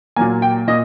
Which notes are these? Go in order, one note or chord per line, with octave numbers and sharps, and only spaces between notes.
A#2 F#3 A#3 G#5
G5
A#2 D#5